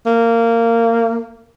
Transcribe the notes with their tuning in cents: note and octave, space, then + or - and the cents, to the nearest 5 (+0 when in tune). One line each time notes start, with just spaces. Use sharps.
A#3 -20